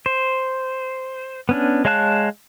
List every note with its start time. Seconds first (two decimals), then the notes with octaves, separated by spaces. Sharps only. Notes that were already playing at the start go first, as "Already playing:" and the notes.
0.06 C5
1.49 B3 C#4 D4
1.85 G#3 C#5 F5 A5 F#6